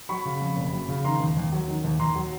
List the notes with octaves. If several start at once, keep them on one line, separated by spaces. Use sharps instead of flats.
F#3 B5 C#6
C#3
F2
F#1
F#3
C#3
D#3 A#5 C6
D#2
D#2
F#3
D#3
D#2
D#2 A#5 C6
F#3